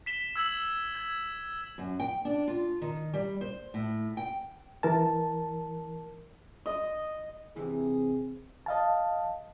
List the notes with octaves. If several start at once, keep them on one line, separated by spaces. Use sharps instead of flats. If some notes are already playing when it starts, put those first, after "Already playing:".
B6 E7 G7
E6 G#6 B6 F#7
G#6
F#2
G5
D4
F4
D#3
G3
C5
A2
G5
E3 A#4 A5
D#5
C3 E3 C4 G#4
D#5 F5 A5